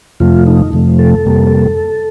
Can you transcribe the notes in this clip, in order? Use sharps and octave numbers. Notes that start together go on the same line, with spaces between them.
F2 C3 F3 A3 F4
D#4
F2 C3 F3 A3
A4
F2 C3 G3 A#3